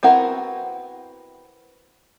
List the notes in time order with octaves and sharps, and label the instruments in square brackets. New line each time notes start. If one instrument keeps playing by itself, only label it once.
[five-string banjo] B3 C4 E4 F#4 A#4